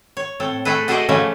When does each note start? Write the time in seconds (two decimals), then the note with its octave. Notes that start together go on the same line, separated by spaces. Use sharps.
0.17 C#5
0.40 A2 C4 A4
0.65 A3 G#4 A4 B4
0.88 F#4 G#4 A4 C5 D5 D#5
1.09 C#3 E3 F3 A3 C#4